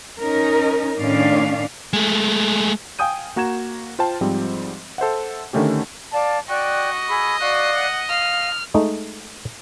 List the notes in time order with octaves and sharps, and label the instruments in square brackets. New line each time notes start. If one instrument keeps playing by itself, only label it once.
[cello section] C#4 D#4 A#4
A2 D#3 C#4 D4 D5 F5
[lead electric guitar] G#3 A3
[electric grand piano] F5 G5 G#5 D#6 G6 D#7
A#3 F#4 A#5 G#6 E7
F4 C5 G5 A5
G#2 F3 G3 C4
A4 C5 E5 F#5
D3 D#3 A3 C#4 G4
[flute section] D5 F5 A5
[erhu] F#4 [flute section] D5 G5 F#6 [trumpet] D#5
[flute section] G#4 B5 E6
[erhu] F#4 [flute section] D5 F5 F#6
[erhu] F#5
[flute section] F5 [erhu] F6
[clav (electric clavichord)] G#3 A3 D#4